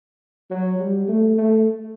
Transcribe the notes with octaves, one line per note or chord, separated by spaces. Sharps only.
F#3
G3
A3
A3